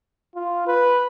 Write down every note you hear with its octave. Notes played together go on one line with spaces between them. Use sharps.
F4
B4